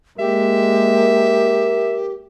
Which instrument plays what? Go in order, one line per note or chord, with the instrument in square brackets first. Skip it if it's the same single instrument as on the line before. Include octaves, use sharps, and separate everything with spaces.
[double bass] G#3 A#3 [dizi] G4 [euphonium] A#4 [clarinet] E5